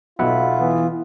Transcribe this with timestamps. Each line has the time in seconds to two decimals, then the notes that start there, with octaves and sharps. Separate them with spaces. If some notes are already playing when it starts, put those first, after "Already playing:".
0.19 B1 B2 F4 E5 F#5 B5
0.59 E3 B3